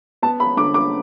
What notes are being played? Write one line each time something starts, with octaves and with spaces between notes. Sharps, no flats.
B3 A5
B5
D3 D6
D6